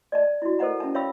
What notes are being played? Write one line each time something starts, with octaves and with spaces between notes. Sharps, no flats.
D5 D#5 A5
E4 F#4
A4 A#4 C5 D#5 F#5 A#5
C#4 E5 A5
C#5 E5 F5 G5 B5 E6